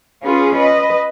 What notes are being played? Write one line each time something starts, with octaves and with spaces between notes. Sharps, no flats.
C#4 F4 G#4 B4
B4 D#5